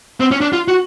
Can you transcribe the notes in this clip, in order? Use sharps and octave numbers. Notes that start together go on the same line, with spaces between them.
C4
C#4
D4
F4
F#4